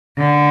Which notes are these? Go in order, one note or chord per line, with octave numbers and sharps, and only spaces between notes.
D3